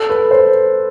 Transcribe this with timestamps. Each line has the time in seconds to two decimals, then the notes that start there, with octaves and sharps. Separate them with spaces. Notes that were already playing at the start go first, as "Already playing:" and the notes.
Already playing: A4
0.10 B4
0.31 C5